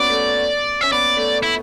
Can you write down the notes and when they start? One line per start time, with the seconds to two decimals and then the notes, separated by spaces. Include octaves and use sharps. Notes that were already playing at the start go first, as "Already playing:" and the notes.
Already playing: B3 C#4 F#4 D5
0.10 A3
0.81 C#4 E5
0.92 B3 D5
1.17 A3
1.43 E4